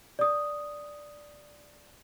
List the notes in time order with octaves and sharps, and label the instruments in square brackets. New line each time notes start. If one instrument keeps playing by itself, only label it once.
[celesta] D5 D#6